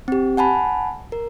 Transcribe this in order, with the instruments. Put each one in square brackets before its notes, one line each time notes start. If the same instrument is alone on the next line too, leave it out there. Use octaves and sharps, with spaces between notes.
[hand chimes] C4 G4
F#5 G#5 A5 B5
A#4